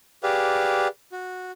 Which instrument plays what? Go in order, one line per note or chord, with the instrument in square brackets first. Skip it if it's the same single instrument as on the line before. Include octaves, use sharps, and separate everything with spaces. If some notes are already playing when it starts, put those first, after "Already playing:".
[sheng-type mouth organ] G4 G#4 B4 D5 F5
F#4